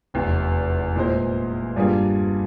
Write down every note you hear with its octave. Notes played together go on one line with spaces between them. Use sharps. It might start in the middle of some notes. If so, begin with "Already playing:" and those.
F1 E2 E3
A#2 G#3 E4 G#4 C5
G2 G3 A#3 F4 G#4